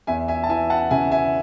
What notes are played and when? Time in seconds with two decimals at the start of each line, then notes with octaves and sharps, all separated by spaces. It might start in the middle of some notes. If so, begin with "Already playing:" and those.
0.07 E2 E5 G#5
0.28 E5 G#5
0.43 A5
0.49 E3 E5 G#5
0.70 F#5 A5
0.90 C#3 E5 G#5
1.12 E5 G#5